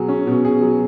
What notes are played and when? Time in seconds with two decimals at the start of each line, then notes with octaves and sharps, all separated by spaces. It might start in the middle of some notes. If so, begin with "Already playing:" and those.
Already playing: B2 F#3 G#4
0.08 C#4
0.27 B2
0.45 G#4
0.61 F#3